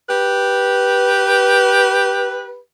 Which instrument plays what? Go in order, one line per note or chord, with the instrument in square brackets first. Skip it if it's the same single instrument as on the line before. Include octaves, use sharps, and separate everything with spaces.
[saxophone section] G4 B4